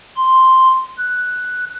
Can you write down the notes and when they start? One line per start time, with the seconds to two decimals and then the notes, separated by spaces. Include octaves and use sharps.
0.16 C6
0.98 F#6